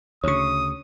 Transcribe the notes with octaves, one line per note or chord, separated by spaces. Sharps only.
D2 C#3 C#5 C#6 D#6